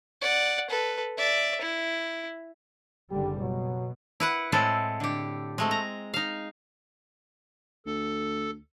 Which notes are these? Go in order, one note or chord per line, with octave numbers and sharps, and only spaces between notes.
D5 F#5
A4 B4
D5 E5
E4
F#1 D3 G3 G4
B2 F#3
E4 B4 F#5
A2 G#3 C4 E4 A4
D3 G4
G#3 A3 C4
A#5
D#4 F5
D2 A4